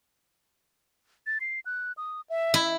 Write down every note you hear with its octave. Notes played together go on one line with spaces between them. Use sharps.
A6
C7
F#6
D#6
E5
E4